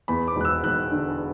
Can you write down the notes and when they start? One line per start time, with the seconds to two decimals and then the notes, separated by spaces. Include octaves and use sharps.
0.08 E2 B5
0.28 D6
0.36 E1 F#6
0.45 E6
0.64 E1 F#6
0.91 D3